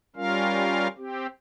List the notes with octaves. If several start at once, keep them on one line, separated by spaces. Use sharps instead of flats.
G3 C#4 F4 A#4 F5
C4 G4